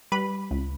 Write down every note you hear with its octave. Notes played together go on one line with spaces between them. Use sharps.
G3 B4 B5
C#2